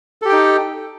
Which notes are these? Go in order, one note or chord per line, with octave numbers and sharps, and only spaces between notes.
D#4 G4 A4 G5